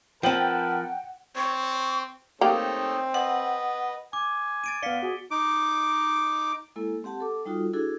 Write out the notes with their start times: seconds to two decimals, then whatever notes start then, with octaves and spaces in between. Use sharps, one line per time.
0.23 F3 C4 A#4 B4 F#5 G5 A5 F#7
1.36 C4 C#6
2.41 A3 A#3 C4 D#4 G4 C#5
3.14 B4 D#5 F#5
4.13 G#5 D6
4.64 A6 D7 D#7
4.83 B3 D5 F5 B6 C#7 G7
5.03 F#4 G#4
5.31 D#4 D6
6.76 G#3 A#3 E4 A4
7.04 C4 G4 F#5 A5
7.20 A4 D6
7.46 G3 D#4 F4 F#4 A4
7.73 D4 E4 F#4 G#4 A4